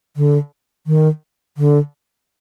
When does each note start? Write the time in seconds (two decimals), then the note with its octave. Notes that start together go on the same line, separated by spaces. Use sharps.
0.17 D3
0.87 D#3
1.57 D3